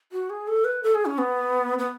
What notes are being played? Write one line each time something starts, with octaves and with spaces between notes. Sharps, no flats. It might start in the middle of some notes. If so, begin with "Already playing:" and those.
F#4
G#4
A4
B4
A4
G#4
C#4
B3
B3